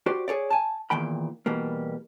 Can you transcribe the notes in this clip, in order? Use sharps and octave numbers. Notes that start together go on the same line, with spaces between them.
F#4 G4 C5 D5
G#4 A4 C#5 D5
G#5 A5
E2 A#2 D#3 G5 B5
B2 E3 G3 A#3